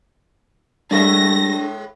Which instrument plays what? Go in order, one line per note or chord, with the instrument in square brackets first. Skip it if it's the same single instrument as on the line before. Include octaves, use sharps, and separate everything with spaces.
[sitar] A2 G#3 E5 [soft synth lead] G3 [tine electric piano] D4 [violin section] A#6